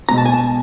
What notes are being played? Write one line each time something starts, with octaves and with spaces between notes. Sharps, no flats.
B2 G#3 B3 A#5
A5
G#5
A5